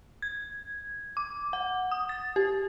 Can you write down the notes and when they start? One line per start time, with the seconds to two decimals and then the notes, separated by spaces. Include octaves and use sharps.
0.22 G#6
1.17 D6
1.53 F#5
1.91 D#6
2.09 A6
2.36 G4